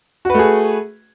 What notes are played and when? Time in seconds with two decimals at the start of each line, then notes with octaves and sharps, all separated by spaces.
0.25 F#4
0.30 B4
0.34 A3
0.39 G#4